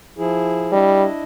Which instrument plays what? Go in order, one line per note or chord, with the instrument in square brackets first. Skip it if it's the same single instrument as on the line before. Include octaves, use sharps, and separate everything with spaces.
[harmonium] F3 E4 G#4
[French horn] G3 [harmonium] D4 E4 D#5